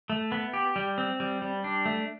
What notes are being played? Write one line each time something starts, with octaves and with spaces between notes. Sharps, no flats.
A3
B3
G4
G3
C4
G3
G3
D4
A3